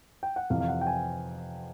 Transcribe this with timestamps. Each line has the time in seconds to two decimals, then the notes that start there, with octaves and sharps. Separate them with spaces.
0.23 G5
0.36 F#5
0.50 F2 C3 E3 F5
0.61 F5
0.68 F#5
0.81 G5
0.87 G#5